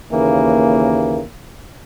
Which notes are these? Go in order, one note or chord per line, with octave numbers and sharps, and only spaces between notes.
D#2 C#3 E3 A#3